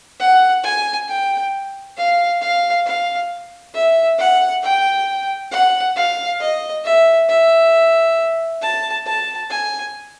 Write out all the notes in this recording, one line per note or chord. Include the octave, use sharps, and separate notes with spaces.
F#5
G#5
G5
F5
F5
F5
E5
F#5
G5
F#5
F5
D#5
E5
E5
A5
A5
G#5